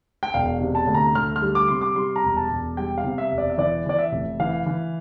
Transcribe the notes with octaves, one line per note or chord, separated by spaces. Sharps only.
G5
E1 F5
C3
A5
D2
A#5
D2 F6
F6
G3
D6
C3 C6
D6
G3 C6
A#5
E1
A5
E1
G3 G5
F5
C3
E5
E1
D5
E5
E3 D5
E3 D5
E5
F1
E3 F5
E3